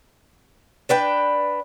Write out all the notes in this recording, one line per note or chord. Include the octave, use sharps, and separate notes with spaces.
D4 B4 G5